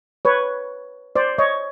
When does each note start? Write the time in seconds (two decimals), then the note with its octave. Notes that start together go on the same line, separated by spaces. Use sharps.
0.25 B4 C#5
1.16 C5 D5
1.38 C#5 D#5